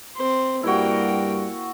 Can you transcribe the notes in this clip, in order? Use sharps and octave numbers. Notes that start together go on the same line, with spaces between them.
C4 C5
G2 G3 A#3 E4 F#4 G5